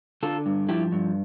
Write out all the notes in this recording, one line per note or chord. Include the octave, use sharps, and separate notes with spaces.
D3 F4 A4
G2
F3 E4 G4
G2